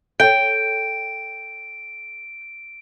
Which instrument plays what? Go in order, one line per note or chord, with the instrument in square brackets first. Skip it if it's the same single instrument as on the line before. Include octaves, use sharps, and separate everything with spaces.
[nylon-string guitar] A4 C#5 [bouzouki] G5 [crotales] D7